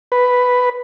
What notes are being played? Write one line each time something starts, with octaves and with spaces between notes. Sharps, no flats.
B4